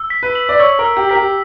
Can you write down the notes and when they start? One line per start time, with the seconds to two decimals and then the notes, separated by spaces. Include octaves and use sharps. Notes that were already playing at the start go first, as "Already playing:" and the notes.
Already playing: E6
0.10 B6
0.23 B4
0.35 F#7
0.49 D5
0.59 C#5 E6
0.79 A#4
0.85 E6
0.97 G4
1.10 A#4 B6
1.15 G4